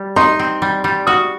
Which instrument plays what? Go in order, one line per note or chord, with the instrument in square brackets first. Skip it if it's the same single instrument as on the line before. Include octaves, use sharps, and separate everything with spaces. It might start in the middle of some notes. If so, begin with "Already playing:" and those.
Already playing: [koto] G3
[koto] D#4 [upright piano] C6
[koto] C4
G3
G3
[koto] F#4 [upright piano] D#6